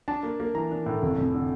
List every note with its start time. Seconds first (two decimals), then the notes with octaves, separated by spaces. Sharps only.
0.08 D4 A5
0.23 A#3
0.40 A#3
0.55 E3 A#5
0.71 D4
0.86 A2
1.02 F1
1.17 F1
1.34 D3